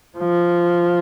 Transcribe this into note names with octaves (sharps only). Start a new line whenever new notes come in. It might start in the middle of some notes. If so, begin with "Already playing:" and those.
F3